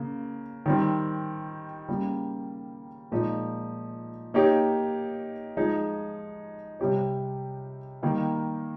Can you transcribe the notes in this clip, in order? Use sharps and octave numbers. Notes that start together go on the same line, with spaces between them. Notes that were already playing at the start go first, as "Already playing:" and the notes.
Already playing: C#3 A#3
D#3 G3 C4
C#3 G3 A#3
A#2 F3 G#3 D#4
A#3 D#4 G4 C#5
F3 G#3 D#4 G#4
C3 G3 C4 G4 C#5
D#3 G3 A#3 D#4